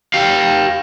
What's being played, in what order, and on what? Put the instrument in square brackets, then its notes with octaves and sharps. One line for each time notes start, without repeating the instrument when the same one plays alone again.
[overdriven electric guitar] G4 F5